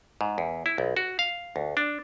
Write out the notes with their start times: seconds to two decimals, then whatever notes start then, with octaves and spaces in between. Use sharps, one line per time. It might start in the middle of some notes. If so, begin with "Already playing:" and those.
0.21 G#2
0.38 E2
0.66 E4
0.78 B1
0.97 F#4
1.19 F5
1.56 D2
1.77 D4